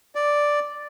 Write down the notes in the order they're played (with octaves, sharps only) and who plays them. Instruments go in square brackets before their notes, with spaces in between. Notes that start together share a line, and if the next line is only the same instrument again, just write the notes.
[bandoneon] D5